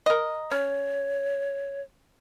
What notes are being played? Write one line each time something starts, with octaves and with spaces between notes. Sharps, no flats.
A#4 D#5
C#4 C#5